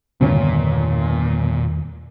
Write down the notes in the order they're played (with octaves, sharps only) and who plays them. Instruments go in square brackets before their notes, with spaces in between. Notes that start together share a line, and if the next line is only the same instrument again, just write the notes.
[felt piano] G1 C#5 [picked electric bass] E2 D#3 A3 [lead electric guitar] A#2